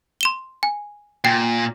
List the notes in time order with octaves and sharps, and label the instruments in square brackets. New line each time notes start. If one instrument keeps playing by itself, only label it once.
[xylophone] C6 E7 G7
G#5
[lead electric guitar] A#2 [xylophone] G5